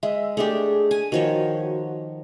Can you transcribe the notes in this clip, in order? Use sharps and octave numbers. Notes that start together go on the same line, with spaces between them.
G#3 E5
A3 D4 G4 G#4
G#5
D#3 F3 F#4 C#5